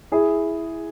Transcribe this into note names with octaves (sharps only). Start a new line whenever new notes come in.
E4 G#4